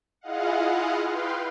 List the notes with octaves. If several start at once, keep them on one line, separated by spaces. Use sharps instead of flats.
E4 F4 G#4 D#5 F5 F#5
B4 F5 G5 C6